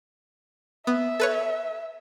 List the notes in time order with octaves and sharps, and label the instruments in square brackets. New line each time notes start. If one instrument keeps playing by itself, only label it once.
[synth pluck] B3 [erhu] E5
[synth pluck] A4 B4 C#5